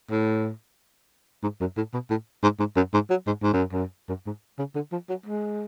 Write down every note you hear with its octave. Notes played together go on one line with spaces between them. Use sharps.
A2
G#2
F#2
A2
B2
A2
G#2
G#2
F#2
G#2
F#3
G#2
G#2
F#2
F#2
F#2
G#2
C#3
D3
F3
F#3
G#3